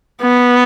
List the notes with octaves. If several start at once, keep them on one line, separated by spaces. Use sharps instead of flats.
B3